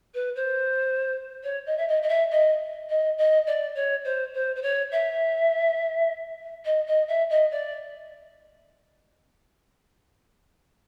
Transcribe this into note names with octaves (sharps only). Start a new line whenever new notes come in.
B4
C5
C#5
D#5
E5
D#5
D#5
E5
D#5
D#5
D#5
D5
C#5
C5
C5
C5
C#5
E5
D#5
D#5
E5
D#5
D5